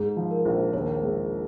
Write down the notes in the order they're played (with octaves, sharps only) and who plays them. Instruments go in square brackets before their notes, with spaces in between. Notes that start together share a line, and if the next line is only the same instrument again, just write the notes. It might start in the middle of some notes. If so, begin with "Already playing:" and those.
Already playing: [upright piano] G#2 [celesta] G#4
[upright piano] F3
[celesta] A#4
[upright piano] A#1
[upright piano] D#2 [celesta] C#5
[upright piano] G#3